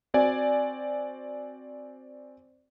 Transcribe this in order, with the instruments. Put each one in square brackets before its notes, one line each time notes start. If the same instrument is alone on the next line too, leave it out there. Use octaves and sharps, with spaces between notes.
[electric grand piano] C4 F#4 D5 G#5